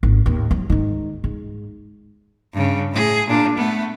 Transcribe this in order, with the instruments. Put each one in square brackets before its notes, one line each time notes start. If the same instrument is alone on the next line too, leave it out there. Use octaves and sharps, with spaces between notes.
[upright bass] G#1 A2
D#2 A2
F#3
G#2 D#3
G#2
[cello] G2 C#3
A2 G#4
A#2 D4
A3 B3